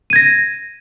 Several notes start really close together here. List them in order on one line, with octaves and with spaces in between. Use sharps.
D#7 G#6 A#6